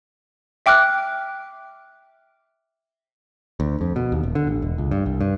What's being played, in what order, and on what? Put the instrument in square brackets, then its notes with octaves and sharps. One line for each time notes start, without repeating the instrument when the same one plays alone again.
[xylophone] E5 G5 D6 F6 F#6
[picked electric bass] D2
F2
B2
D#2
D#1
D3
A1
E1
C#2
G2
C2
G2